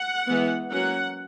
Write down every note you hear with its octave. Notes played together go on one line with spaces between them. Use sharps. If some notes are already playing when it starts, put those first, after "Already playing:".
Already playing: F#5
E3 G#3 B3
F#3 A#3 C#4 F#5